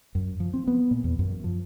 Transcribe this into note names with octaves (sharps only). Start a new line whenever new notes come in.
F#2
F3
C4
B3
A#2
E2
F#2
F3